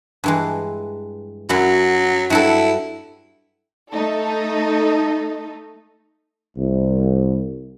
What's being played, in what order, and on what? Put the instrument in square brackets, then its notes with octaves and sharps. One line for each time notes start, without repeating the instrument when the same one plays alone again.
[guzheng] G2 E3 G#3
[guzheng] F#2 E4 [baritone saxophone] F#3
[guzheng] G2 F#3 A4 [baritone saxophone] E4
[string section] A3 D#4 A4
[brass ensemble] C2